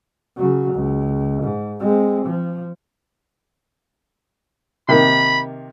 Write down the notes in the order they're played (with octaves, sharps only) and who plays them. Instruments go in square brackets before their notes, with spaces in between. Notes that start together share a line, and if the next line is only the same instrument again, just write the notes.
[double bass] C#3 F#3
C#2
G#2
G#3 C4
F3
[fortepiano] C3 D#3 A#3 [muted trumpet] B5